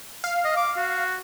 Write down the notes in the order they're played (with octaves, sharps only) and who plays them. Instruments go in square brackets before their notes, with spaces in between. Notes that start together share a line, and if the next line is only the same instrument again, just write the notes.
[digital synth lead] F5
[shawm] D#5
D6
F#4